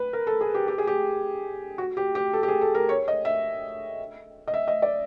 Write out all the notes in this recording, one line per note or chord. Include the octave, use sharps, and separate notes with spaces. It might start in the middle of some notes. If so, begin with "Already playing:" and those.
Already playing: B4
A#4
A4
G#4
G4
G4
G#4
G4
F#4
G4
G4
A4
G4
G#4
A4
A#4
C#5
D#5
E5
D#5
E5
D#5
D5